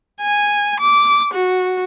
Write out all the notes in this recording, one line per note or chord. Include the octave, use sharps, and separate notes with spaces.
G#5
D6
F#4